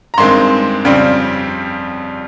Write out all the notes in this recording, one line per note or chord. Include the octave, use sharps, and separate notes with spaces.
A#5
G2 D#3 G#3 C4 C6
F2 C#3 G3 C4